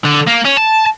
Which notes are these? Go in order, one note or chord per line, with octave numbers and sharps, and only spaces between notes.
D3
A#3
C#4
A5